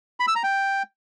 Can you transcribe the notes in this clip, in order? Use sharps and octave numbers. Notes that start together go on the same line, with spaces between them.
B5
E6
A#5
G5